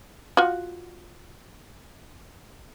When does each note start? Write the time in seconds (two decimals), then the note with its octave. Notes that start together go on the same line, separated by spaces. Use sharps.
0.37 F4 F#4